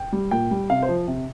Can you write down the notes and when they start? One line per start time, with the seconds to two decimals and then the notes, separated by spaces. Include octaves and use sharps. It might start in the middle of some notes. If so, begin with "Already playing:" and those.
Already playing: G5
0.13 G3
0.31 A#2 G5
0.51 G3
0.70 C3 F5
0.83 C5
0.89 F3
1.07 C3